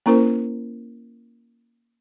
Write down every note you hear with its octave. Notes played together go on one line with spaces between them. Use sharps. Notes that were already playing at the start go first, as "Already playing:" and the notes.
A#3 C#4 E4 A#4 C5